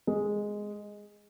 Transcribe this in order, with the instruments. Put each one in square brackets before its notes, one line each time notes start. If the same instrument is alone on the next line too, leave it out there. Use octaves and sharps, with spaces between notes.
[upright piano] G#3